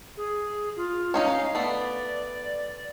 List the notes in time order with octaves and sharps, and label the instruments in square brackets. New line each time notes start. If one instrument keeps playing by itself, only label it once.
[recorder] G#4
F4
[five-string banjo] C#4 D#4 C#5 [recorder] F5
[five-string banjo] A3 B3 [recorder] D5